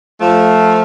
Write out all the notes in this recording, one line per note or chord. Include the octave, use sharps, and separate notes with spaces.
F3 A3